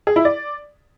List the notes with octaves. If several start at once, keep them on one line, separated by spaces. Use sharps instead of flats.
G#4
E4
D5